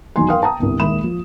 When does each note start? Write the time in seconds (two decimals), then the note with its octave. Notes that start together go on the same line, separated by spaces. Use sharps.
0.16 E1 D#3 F#3 D#4 G#5 C6
0.28 A#4 F5 G5 C6 D#6
0.42 G5 A5 A#5 D#6
0.59 G1 C2
0.80 D#1 D#2 G#3 E5 B5 E7
1.04 F3